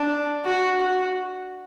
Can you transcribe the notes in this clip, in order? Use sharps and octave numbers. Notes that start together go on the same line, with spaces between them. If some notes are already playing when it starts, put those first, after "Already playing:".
Already playing: D4
F#4
F#4